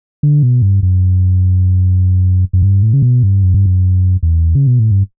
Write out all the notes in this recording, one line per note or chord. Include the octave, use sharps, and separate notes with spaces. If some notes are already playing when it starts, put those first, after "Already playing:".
D3
B2
G2
F#2
F#2
G2
A2
C#3
B2
G2
F#2
G2
F#2
E2
C#3
B2
A2
G2